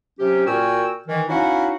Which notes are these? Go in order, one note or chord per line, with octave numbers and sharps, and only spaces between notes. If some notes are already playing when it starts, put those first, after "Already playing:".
C3 F#3 C#4 G4
A#2 F#4 A#4 G5 G#5 E6
D#3 E3
C#4 D#4 E4 F#4 F5 F#5